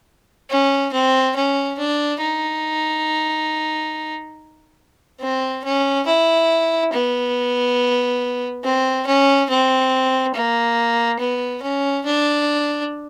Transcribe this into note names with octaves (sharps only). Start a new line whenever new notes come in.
C#4
C4
C#4
D4
D#4
C4
C#4
E4
B3
C4
C#4
C4
A#3
B3
C#4
D4